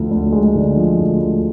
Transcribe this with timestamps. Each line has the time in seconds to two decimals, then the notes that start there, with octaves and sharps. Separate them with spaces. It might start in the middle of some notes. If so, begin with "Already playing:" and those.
Already playing: D2 F3
0.11 D2
0.32 G#3
0.55 D3
0.77 F3
0.99 D2
1.21 D2